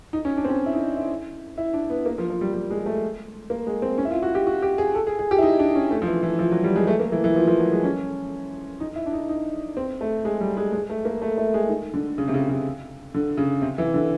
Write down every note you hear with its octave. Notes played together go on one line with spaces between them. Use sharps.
D#4
C#4
D4
C4
C#4
E4
D#4
E4
E4
D4
B3
A#3
F3
F3
G3
G3
G#3
A3
A#3
G#3
C4
C#4
E4
F4
F#4
G4
F#4
G4
G#4
A4
G#4
G#4
G4
E4
D#4
D4
C#4
A3
F3
E3
E3
F3
F#3
G3
G#3
A3
A#3
E3
E3
F3
F3
F#3
G#3
C#4
D#4
E4
D4
D#4
D#4
C4
A3
G#3
G3
G#3
G#3
A3
A#3
A3
A3
G#3
D#3
D3
C#3
C3
C#3
C#3
D3
C#3
C3
E3
D3